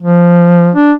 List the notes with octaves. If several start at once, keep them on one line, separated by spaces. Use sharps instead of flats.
F3
D4